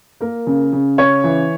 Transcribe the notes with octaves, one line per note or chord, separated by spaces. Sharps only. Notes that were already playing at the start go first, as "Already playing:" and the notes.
A#3 A#4
C#3
C#3
C#3 C#5
E3